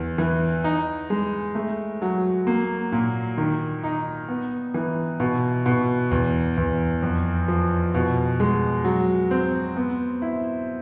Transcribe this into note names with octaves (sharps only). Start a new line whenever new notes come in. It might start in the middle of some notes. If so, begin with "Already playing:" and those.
Already playing: E2
E3
D#4
G#3
A3
F#3
A#3
A#2
D#3
D#4
B3
E3
B2
B2
E2
E2
F2
F3
B2
G#3
F#3
C4
B3
E4